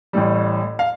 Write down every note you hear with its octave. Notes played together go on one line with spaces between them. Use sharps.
A1 A2 G3
F5